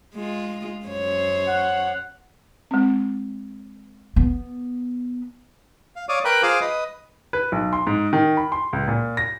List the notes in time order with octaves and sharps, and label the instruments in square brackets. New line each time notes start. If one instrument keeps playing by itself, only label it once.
[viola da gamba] G#3 F4
F#2 C5 C#5
[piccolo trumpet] F#5
[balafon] G#3 C4
[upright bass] B3
[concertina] F5
C#5 D5 F5 D6 D#6
A#4 B4 G5 B5 F#6
F4 G#4 C5 F5 G#5 D6
B4 D#5
[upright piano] B4
B1
C6
G#2
D#3
B5
C6
C#2
A#2
A#6